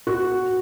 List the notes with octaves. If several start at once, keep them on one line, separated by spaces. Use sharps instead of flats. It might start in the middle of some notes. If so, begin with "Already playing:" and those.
F#4